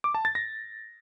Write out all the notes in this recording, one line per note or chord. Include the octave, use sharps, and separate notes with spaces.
D6
A5
A6
A#6